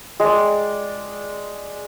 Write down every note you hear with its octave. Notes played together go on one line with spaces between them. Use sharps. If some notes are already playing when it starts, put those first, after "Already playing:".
G#3 D5